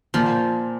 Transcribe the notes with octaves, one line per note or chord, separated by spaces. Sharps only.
A#2 F3